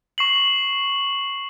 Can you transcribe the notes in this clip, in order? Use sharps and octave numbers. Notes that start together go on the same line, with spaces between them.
C#6 C7 F#7